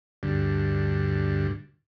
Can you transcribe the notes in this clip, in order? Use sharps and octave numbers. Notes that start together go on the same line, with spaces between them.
D2 G2